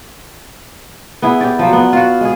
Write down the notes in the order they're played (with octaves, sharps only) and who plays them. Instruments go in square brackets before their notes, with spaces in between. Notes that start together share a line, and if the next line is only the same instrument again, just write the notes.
[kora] B3 E4 G#4
G4 D5
F3 F#3
B3
F4 F#4
G#3 G#4